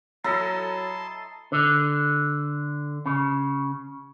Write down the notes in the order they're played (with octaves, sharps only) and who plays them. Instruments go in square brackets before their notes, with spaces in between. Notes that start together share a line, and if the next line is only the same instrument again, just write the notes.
[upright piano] F#3 [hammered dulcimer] E4 A4 D#5 [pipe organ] A5 C6 [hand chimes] A#5
[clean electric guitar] D3
C#3